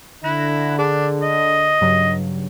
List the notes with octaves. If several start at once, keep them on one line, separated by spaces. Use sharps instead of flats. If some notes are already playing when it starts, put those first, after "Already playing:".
D3 E4 F#6 A#6 E7
D4 G#4
D#5
G2 C#3 F#3